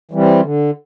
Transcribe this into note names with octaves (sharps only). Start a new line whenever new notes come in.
E3 G3 C4
D3